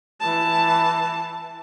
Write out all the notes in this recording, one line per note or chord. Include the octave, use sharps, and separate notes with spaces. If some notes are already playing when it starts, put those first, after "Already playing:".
E3 A5